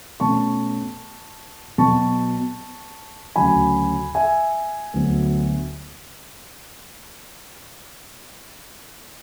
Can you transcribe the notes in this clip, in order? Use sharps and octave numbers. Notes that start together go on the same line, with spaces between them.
B2 A3 C#4 A5 C#6
B2 F#3 B3 A5 C#6
D2 C#3 F#3 G#5 B5
E5 G#5
D2 D3 F#3 B3